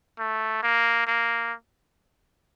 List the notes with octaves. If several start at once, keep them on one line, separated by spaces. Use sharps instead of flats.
A3
A#3
A#3